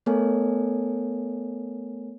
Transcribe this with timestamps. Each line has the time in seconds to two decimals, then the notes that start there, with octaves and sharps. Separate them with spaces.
0.06 A3 B3 A4 A#4 C#5 G#5